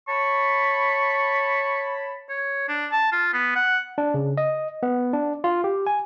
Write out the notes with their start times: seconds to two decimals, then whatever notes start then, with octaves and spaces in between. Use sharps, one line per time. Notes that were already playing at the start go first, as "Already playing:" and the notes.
0.08 C#5 A5 B5 C#6
2.29 C#5
2.68 D4
2.91 A5
3.12 F4
3.33 B3
3.55 F#5
3.98 D4
4.14 C#3
4.38 D#5
4.83 B3
5.13 D4
5.44 F4
5.64 G4
5.87 G#5